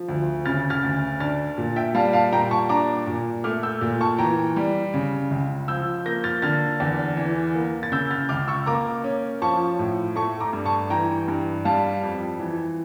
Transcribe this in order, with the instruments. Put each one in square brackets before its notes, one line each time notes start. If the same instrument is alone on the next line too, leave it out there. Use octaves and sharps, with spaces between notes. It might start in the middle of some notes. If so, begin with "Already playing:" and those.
Already playing: [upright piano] F3
D2
C#3 F6 A6
F6 A6
D2
D4 F6 A6
A#2
E5 G5
G3 F5 A5
F5 A5
A#2 G5 A#5
A5 C#6
D4 A#5 D6
A#2
A3 D6 F6
E6 G6
A#2
A5 C#6
E3 G5 A#5
G3
C#3
C#2
F3 E6 G6
A#3 G6 A#6
F6 A6
D3 F6 A6
E2
E3
A#3
A6
C#3 E6 G6
F6 A6
C#2 D6 F6
C#6 E6
A#3 A#5 D6
C#4
F3 A5 C#6
A2
A3 A5 C#6
A#5 D6
G2
A5 C#6
E3 G5 A#5
G2
G3 F5 A5
F2
E3